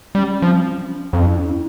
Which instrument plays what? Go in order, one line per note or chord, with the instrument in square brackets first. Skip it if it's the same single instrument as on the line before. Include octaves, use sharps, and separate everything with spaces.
[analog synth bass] G3 [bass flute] C#4
[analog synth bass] F3 [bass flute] C4
[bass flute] C#4
C#4
[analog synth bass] F2
[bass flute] E4
C#4
E4